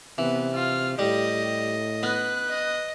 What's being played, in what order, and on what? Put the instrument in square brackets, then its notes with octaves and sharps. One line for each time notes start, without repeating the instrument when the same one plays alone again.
[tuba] C3 [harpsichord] E3 [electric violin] B3
[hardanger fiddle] F4 [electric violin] F6
[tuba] A2 [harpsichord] G3 [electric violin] G4 [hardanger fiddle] D#5
[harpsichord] B3 [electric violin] B4 F#6
[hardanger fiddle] D#5